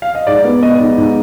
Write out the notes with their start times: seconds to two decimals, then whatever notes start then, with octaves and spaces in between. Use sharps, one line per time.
0.02 F5
0.15 D#5
0.27 G#2 D5
0.44 B3
0.62 B3 D#5
0.80 G#2
0.98 G#2